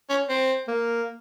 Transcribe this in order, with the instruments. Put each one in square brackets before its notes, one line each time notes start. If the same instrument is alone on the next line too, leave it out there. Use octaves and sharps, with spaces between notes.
[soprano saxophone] C#4
C4
[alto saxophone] A#3